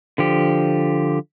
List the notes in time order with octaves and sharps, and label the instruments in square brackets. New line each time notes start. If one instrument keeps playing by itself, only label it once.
[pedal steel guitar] D3 F3 G4